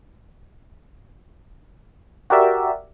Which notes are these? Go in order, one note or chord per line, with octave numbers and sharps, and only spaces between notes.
F#4 G4 A#4 D5 E5